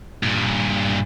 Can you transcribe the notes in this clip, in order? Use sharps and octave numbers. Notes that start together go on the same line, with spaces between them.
G2 A#2